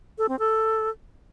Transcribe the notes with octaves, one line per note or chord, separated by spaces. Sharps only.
A4
C4
A4